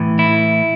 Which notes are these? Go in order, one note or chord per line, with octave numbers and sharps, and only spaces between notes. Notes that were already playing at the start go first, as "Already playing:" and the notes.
Already playing: A2 E3
E4